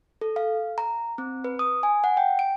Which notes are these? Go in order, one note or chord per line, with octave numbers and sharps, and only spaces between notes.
A4
F5
A#5
C4
B4
D#6
G#5
F#5
G5
D7